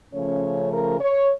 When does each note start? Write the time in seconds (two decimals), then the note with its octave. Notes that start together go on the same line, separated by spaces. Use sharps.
0.13 C#3 F3 A3 C#4 C#5
0.72 A#4
1.00 C#5